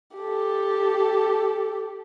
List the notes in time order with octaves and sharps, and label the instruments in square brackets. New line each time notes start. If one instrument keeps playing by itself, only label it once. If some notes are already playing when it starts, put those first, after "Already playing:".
[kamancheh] G4 A4